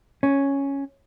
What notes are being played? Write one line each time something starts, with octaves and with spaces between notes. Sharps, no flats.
C#4